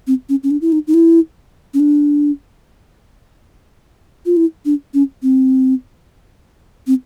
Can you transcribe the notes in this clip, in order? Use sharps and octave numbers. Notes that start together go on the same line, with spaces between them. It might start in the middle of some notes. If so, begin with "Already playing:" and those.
C4
C#4
C#4
D4
E4
D#4
D#4
E4
C#4
D4
F4
E4
D4
C#4
C4
C4